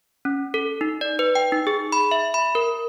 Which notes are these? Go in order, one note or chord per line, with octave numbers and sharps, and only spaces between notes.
C#4
A4
D#4
D5
B4
G5
D#4
G#4
B5
E5
B5
A#4